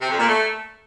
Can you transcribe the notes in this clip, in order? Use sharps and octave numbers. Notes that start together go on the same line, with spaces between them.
C3
F2
A#2
A3